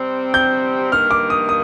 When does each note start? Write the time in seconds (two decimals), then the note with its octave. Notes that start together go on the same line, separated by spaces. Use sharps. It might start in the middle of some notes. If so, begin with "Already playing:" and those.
Already playing: C3 G3 C4
0.34 G6
0.92 G2 D#3 A#3 F6
1.11 D6
1.30 D#6
1.49 D#6